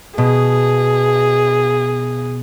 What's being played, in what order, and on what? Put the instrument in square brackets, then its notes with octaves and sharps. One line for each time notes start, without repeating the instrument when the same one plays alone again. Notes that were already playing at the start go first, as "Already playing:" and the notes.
[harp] B2 [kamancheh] G#4